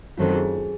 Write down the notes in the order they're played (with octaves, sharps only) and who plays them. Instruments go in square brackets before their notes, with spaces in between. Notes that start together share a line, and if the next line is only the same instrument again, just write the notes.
[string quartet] F#2 D#3 F#3 A3 C4 [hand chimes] F4
[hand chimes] G#4